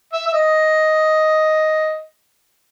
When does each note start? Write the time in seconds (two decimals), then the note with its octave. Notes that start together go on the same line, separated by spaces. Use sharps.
0.13 E5
0.26 E5
0.34 D#5